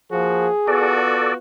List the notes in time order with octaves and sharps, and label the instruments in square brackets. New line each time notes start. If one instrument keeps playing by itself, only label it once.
[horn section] F3 A#3 F#4 [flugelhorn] G#4
[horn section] B3 F4 F#4 [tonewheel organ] A4 D5